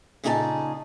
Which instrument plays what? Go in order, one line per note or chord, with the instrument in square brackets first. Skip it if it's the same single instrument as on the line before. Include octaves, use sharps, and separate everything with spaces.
[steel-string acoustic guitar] A#2 C#3 D#4 G#4 A#4 A5